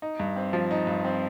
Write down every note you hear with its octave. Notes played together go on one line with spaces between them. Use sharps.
D#4
G2
C4
F3
D#4
G2
C4